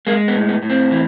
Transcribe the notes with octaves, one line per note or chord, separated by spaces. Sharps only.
G#3 A#3
B3
A2
B3
A2
C4
E3